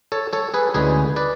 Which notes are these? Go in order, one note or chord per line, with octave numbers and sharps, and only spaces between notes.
A4 C#5
A4 C#5
G#4 B4
D2 D3 G#3 C#4 E4 G#4 B4
B4 D5